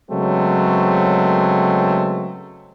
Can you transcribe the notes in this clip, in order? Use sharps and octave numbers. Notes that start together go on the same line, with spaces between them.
C#3 F#3 G#3 A3 B3 C4